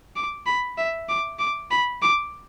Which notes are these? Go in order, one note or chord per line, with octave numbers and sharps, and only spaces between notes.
D6
B5
E5
D6
D6
B5
D6